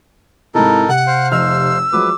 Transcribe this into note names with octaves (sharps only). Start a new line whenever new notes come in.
G#2 C3 D#4 E4 A4 A#4
C3 F#5 G5
C5 F5
F1 D#4 E6 F6
F3 F#3 G#3 B4 D6